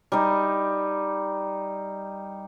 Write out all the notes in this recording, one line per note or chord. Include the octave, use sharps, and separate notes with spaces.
G3 D#4